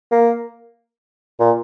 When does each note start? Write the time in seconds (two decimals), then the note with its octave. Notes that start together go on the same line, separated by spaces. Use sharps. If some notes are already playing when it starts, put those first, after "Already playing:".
0.11 A#3
1.40 A#2